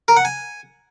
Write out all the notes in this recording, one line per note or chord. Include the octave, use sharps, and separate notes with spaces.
A#4
F#5
G#5